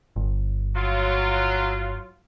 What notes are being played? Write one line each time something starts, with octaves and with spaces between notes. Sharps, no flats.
G1
F#3 F4